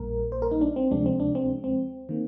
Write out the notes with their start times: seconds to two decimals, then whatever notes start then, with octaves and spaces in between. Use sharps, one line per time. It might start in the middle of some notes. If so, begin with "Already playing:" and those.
Already playing: A#1 A#2 G3 A#3 A#4
0.32 C5
0.42 A#4
0.51 D#4
0.61 D4
0.76 C4
0.91 D2 C3 F3 G#3 D4
1.06 C4
1.20 D4
1.35 C4
1.64 C4
2.09 D#3 A#3